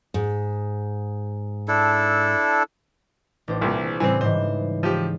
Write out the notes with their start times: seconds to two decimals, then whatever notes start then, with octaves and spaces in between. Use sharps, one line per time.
0.14 G#2
1.68 D4 E4 A4
3.48 A1 D4 C5
3.61 C2 A#2 G#4
4.00 A2 C#3 E3 G3 C4
4.21 G#2 E3 C5
4.83 F3 G4 D#7